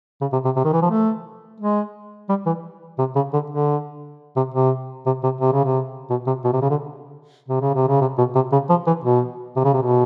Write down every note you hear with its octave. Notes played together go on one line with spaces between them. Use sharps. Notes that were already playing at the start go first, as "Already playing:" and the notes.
C#3
C3
C3
C3
D#3
E3
F3
A3
G#3
G3
E3
C3
C#3
D3
D3
C3
C3
C3
C3
C3
C#3
C3
B2
C3
B2
C3
C#3
D3
C3
C#3
C3
C#3
C3
B2
C3
C#3
F3
E3
B2
C3
C#3
C3
B2